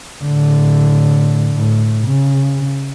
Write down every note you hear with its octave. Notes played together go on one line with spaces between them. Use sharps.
A2 D3
A2
C#3